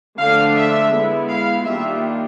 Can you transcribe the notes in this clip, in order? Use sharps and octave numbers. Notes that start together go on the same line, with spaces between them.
D3 F3 A3 D4 F5
E5
G#3 B3 E4
F5
D#3 G3 A#3 D4 F4 E5